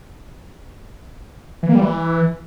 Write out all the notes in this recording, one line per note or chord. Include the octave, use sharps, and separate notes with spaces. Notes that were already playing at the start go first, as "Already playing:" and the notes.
E3
A#3
G3
E3